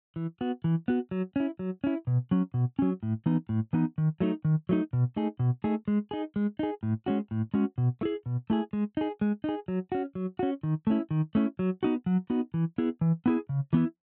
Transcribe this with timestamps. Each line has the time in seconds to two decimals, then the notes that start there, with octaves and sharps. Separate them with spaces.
0.16 E3
0.41 B3 F#4
0.64 E3
0.88 B3 F#4
1.11 F#3
1.36 C#4 E4
1.59 F#3
1.84 C#4 E4
2.07 B2
2.31 F#3 C#4
2.54 B2
2.79 F#3 C#4
3.03 A2
3.26 E3 B3 D#4
3.49 A2
3.73 E3 B3 D#4
3.98 D#3
4.20 F#3 A3 D#4
4.45 D#3
4.69 F#3 A3 D#4
4.93 B2
5.16 A3 D#4 G#4
5.39 B2
5.64 A3 D#4 G#4
5.88 G#3
6.11 D#4 G#4
6.36 G#3
6.59 D#4 G#4
6.83 A2
7.06 G#3 C#4 F#4
7.31 A2
7.54 G#3 C#4 F#4
7.78 B2
8.01 A3 E4 G#4
8.26 B2
8.50 A3 E4 G#4
8.73 G#3
8.97 D#4 G#4
9.21 G#3
9.44 D#4 G#4
9.68 F#3
9.92 C#4 F#4
10.15 F#3
10.39 C#4 F#4
10.63 D#3
10.87 A3 C#4 E4
11.11 D#3
11.35 A3 C#4 E4
11.59 F#3
11.83 B3 D#4 F#4
12.06 F#3
12.30 B3 D#4 F#4
12.54 E3
12.78 B3 E4 G#4
13.01 E3
13.26 B3 E4 G#4
13.49 C#3
13.73 E3 B3 E4